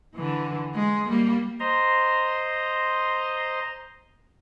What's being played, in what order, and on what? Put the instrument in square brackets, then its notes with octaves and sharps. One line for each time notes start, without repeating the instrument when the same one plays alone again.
[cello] D3 E3
G#3
G3 A#3
[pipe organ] C5 D#5 A#5 C6